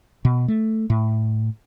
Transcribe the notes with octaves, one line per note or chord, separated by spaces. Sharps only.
B2
A3
A2